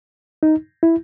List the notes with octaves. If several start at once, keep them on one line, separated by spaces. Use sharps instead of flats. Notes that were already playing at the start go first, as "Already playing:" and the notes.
D#4
E4